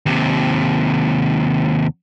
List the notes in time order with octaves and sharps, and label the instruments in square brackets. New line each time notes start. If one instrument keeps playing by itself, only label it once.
[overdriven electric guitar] D#2 C3